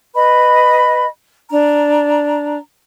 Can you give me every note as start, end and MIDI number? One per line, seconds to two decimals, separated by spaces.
0.15 1.06 71
0.15 1.06 75
0.15 1.06 83
1.51 2.57 62
1.51 2.57 82